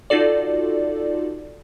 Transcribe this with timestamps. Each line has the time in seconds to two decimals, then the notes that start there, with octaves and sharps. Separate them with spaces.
0.10 D#4 F4 F#4 A4 D5